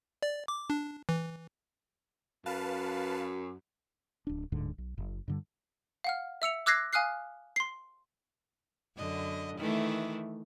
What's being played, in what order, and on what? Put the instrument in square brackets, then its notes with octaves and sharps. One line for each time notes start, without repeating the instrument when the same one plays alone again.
[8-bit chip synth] D5
D6
D4
E3
[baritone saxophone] F#2 [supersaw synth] B4 F5 A5
[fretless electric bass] D1 D4
D1 D2 G#2 D3
B1
F#1
G2 D3 G3
[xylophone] F5 F#5 F6
E5 E6 C#7 F7
D6 E6 F#6 G#6 A#6 C7
F5 G#5 D#6 F6 F#6 C7
C6 C7
[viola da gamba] F#2 D3 D#5
D#3 E3 A3